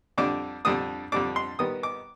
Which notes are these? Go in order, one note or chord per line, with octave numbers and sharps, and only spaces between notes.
F2 D3 G3 D4 D6
F2 D3 G3 D4 D#6
F2 D3 G3 D4 D6
C6
D#3 G3 B3 D#6
D6